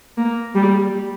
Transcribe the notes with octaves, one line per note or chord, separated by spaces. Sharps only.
A#3
G3